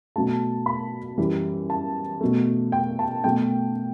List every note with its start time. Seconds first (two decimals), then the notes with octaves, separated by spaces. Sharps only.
0.16 B2 F#3 A3 A5
0.66 B5
1.18 F#2 E3 G3
1.70 A5
2.21 B2 F#3 A3
2.72 G5
2.99 A5
3.24 B2 F#3 A3 G5